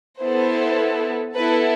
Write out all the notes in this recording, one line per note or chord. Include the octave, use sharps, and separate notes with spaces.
B3 E4 A4 C5
B3 E4 A4 B4